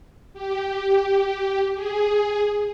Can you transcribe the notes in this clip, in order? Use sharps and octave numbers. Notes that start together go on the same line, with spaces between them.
G4
G#4